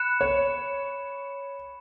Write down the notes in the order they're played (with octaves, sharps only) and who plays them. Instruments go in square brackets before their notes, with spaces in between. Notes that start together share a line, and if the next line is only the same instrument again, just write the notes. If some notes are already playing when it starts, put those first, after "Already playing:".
Already playing: [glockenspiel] B5 F#6 C#7 E7
[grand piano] C#5